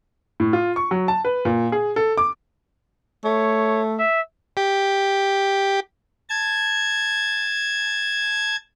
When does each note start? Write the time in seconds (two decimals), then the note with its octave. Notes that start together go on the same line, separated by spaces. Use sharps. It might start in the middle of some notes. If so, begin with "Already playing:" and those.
0.40 A2
0.53 F4
0.76 C#6
0.91 F#3
1.08 A5
1.25 B4
1.45 A#2
1.72 G#4
1.96 A4
2.18 D6
3.25 A3 C#5
3.99 E5
4.57 G4
6.29 A5 G#6